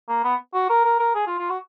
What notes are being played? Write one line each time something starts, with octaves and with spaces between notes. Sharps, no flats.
A#3
B3
F#4
A#4
A#4
A#4
G#4
F4
F4
F#4